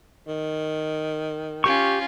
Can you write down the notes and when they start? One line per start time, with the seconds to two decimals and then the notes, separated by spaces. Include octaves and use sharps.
0.28 D#3
1.64 C#4 F4 G4 C#6